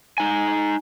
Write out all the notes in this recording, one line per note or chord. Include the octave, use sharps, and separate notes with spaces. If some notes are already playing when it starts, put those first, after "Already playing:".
D#4 G#5